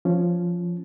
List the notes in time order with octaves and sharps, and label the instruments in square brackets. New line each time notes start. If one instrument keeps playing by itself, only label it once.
[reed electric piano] F3 C#4